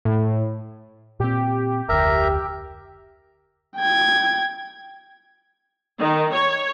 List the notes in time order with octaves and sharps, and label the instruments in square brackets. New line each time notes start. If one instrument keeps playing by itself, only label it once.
[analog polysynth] A2
[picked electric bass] A#2 C4 [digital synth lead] G4
[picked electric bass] F1 D2 [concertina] A#4 E5 A#5
[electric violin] G5 G#6
[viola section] D#3
C#5